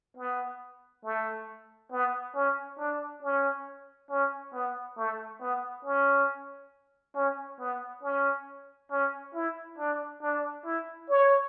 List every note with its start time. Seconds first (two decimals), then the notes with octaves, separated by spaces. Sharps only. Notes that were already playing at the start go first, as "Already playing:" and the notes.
0.17 B3
1.05 A3
1.92 B3
2.35 C#4
2.79 D4
3.23 C#4
4.11 C#4
4.54 B3
4.98 A3
5.41 B3
5.85 C#4
7.16 C#4
7.60 B3
8.03 C#4
8.91 C#4
9.35 E4
9.78 D4
10.22 D4
10.66 E4
11.10 C#5